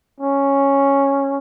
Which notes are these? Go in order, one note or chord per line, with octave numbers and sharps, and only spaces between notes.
C#4